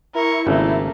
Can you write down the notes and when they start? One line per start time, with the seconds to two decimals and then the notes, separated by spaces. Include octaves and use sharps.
0.15 E4 A#4 C#6
0.47 G#1 C#3 A3 A#3